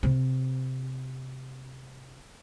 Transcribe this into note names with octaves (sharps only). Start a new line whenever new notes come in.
C3 C4